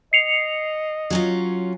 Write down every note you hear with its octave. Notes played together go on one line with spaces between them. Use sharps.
D#5 C7 C#7 F7
F#3 C#4 F4